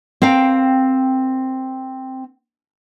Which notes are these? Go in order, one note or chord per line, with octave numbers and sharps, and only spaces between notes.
C4 A#4 F5 G5